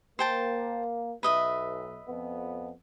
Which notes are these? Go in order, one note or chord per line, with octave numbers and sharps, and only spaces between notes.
A#3 C5 G5 A5
B1 B4 D#5 E5
F2 B3